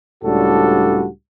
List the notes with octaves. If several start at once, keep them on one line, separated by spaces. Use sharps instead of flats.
C#2 A2 G3 D4 F#4 A4